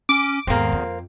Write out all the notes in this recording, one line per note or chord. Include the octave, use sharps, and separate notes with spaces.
C#4 D6
E2 G#2 D#3 A#3 C4
F2